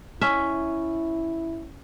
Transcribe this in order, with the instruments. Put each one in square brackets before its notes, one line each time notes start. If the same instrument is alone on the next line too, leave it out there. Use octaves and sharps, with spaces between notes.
[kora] C#4 E5 [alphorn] E4